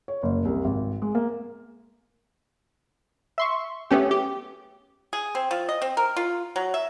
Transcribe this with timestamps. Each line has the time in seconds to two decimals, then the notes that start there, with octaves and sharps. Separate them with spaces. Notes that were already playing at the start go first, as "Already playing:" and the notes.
0.08 C#5
0.23 F#1
0.45 C2
0.65 G#1
1.02 G#3
1.15 A#3
3.38 E5 C6 C#6
3.91 A3 B3 C#4 G4
4.11 G4
5.13 G#4
5.35 C4
5.51 F3
5.69 D#5
5.82 C4
5.97 A#4
6.16 F4
6.56 F#3
6.74 E5